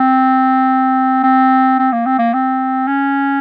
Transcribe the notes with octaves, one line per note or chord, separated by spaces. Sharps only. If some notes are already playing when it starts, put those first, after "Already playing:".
Already playing: C4
C4
C4
A#3
C4
A#3
C4
C#4